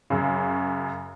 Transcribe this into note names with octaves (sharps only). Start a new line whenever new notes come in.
F#2 C#3